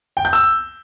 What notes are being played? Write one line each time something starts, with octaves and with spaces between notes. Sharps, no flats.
G5
G6
E6